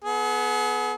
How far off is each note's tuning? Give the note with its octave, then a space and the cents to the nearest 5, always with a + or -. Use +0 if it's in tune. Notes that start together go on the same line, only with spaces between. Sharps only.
B3 +0 G#4 +40